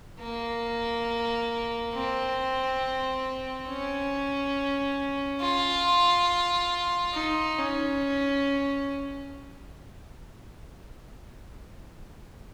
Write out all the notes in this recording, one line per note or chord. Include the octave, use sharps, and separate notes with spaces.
A#3
C4
C#4
F4
D#4
C#4